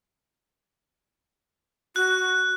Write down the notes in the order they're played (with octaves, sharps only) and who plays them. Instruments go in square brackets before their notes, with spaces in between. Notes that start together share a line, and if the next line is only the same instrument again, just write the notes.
[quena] F#4 [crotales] F#6